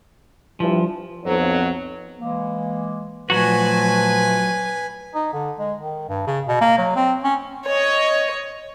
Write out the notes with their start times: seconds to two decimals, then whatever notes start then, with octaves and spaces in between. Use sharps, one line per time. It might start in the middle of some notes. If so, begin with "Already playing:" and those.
0.60 G2 E3 F3
1.25 B1 F2 F#3
2.19 E3 G#3 A#3
3.30 A#2 F3 F#3 A3 F#4 B4 G#5
5.15 D#4
5.33 D3
5.59 G#3
5.80 D#3
6.09 G2
6.27 C#3
6.48 B2
6.61 A#3
6.78 F#3
6.96 C4
7.24 C#4
7.66 C#5 D#5